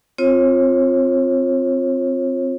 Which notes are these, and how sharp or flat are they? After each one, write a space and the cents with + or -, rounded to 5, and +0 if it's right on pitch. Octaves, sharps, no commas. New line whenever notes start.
C4 +0 F4 +5 C#5 -40